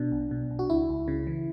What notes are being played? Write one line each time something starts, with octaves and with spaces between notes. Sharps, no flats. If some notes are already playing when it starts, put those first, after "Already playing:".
Already playing: B2 D4
B1
B2
B1
F#4
C#2 E4
C#2
C#3
E3